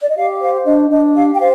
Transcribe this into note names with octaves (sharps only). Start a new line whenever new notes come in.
D5
D#5
G4 F5
C5 F5
D4 D#5
D4 D#5
G4 F5
G5
C5 F5